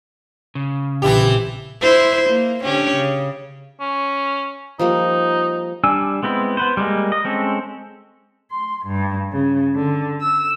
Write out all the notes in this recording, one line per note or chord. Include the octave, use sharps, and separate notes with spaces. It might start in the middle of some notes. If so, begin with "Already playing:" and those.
C#3
A#1 C3 E3 E4 G4
E4 C5
A#3
D3 C#4 G4
C#3
C#4
F3 G3 A#3 D#4
G3 D4 G#5 E6
G#3 B3 C4 E4
B3 B4 C5
G3 G#3 A#3
D#5
G#3 C4 C#4 A4
C6
G2
C#3
D3
E6